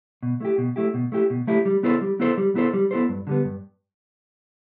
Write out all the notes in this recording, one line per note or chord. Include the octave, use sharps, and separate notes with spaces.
B2
A3 E4 G4
B2
A3 E4 G4
B2
A3 E4 G4
B2
A3 E4 G4
G3
B3 E4 A4 C5
G3
B3 E4 A4 C5
G3
B3 E4 A4 C5
G3
B3 E4 A4 C5
G2
D3 G3 B3
G2